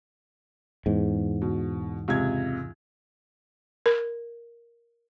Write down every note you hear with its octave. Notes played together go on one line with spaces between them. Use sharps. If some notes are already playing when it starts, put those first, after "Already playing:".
E2 G#2
B2
C#2 C3 G#6
A#4